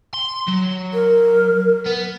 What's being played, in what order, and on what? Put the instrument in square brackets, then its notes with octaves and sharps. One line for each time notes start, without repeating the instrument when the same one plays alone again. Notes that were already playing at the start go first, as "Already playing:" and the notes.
[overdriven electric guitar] C6
F#3
[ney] A#4
[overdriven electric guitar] B3